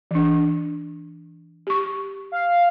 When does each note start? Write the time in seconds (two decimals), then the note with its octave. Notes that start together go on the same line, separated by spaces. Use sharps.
0.11 E3 D4
1.67 G4 C#6
2.32 F5